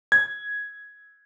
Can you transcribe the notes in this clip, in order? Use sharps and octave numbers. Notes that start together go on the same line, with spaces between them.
G#6